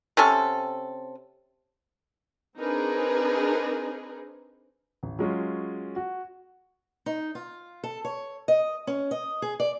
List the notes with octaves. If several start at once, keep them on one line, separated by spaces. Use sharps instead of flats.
C3 C4 C#4 A4
C4 D4 D#4 G#4 A#4 B4
A1
F#3 G#3 C#4 F4
F#4
D#4
F4
A4
C#5
D#5
C#4
D#5
G#4
D5